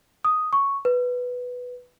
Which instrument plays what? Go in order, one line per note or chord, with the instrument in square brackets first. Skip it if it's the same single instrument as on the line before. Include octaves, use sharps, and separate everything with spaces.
[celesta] D#6
C#6
B4